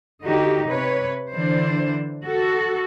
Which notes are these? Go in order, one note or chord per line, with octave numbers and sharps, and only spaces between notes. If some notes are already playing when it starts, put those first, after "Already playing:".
D3 D#4 F#4 G4
C3 B4 C#5
D3 E3 D4 C5
F#4 A4